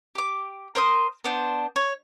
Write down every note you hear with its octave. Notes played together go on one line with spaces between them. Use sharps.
G4 D6
A#4 C5 C6 D#6
B3 D4 C5
C#5